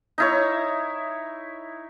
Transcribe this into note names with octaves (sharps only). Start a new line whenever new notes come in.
D#4 E4 C#5